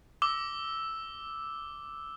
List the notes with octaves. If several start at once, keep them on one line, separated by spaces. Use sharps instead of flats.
D6 E6 G7